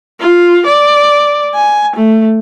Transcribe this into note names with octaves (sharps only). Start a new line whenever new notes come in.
F4
D5
G#5
A3